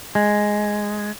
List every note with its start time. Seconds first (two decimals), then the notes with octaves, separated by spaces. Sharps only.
0.15 G#3